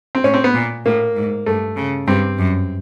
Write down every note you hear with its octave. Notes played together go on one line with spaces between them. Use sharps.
C4
A2 C#4
C4
B3
A#2
A2 A#3
G#2
G2 A3
C#3
G2 C4
F#2